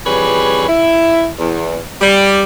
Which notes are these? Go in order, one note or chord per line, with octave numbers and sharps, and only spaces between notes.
F2 E3 G3 G#4 B4 C#5
E4
E2
G3